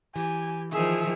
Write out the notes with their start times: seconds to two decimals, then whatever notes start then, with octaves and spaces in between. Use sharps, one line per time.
0.16 E3 G4 G#5
0.72 D#3 F3 G#4 E5